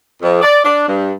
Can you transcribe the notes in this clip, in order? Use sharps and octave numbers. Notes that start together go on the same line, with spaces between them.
F2
D5
D4
G2